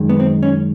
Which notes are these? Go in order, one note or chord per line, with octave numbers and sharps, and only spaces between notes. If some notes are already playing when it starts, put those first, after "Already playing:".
Already playing: F#2 D#3 G#3
B3
C4
C#4